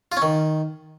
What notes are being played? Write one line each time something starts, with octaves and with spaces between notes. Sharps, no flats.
F4
C#4
D#3